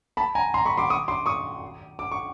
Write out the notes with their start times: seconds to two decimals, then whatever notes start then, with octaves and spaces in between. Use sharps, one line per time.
0.17 A5 B5
0.35 G#5 A#5
0.54 A#5 C6
0.66 B5 C#6
0.78 C6 D6
0.90 C#6 D#6
1.08 C6 D6
1.26 C#6 D#6
1.99 D6
2.12 C#6